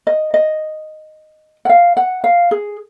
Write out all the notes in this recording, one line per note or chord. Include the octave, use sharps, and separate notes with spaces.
D#5
D#5
F#5
F5
F#5
F5
G#4